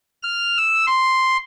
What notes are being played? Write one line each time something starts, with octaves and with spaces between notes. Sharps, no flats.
F6
E6
C6